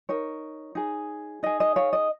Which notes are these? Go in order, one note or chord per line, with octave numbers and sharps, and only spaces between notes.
D#4 A#4 C#5
D#4 G#4
D#4 G#4 D#5
D#5
C#5 F5
D#5